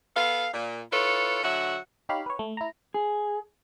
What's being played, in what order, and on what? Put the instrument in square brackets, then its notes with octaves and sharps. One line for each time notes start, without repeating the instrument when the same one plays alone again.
[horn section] B3 A4 F5
A#2
E4 F4 A4 B4 C#5
D3 F#3 F#4 E5 F#5
[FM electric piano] D#4 G4 C#5 F5 B5
B4 C#5
A3
E4 A#5
[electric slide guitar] G#4